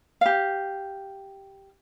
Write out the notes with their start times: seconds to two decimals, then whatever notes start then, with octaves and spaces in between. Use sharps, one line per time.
0.21 G4 F5